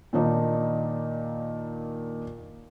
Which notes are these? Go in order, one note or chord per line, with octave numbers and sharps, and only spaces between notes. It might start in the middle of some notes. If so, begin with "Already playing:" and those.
A#2 D#3 A#3 D4 D#4